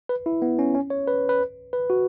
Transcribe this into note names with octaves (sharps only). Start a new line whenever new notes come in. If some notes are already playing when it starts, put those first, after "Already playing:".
B4
E4
B3
C#4
C#4
C#5
B4
B4
B4
F#4